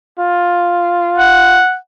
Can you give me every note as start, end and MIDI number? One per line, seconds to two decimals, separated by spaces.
0.19 1.62 65
1.18 1.75 78